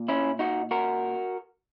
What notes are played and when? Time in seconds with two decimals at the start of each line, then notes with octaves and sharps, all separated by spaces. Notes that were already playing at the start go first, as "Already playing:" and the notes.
Already playing: A#2
0.09 C#4 E4
0.39 D#4 F#4
0.71 F#4 A#4